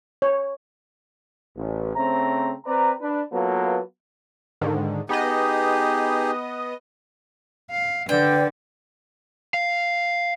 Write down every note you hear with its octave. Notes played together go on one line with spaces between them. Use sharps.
C#5
A1
C#3 A3 C4 C5 A#5
C4 B4 D5 A#5
D4 B4
F#3 A#3 B3 F4 A4 B4
G#2 D3 D#3
B3 D#4 G4 G#4 D#5
F5
D3 B4 D5 G5
F5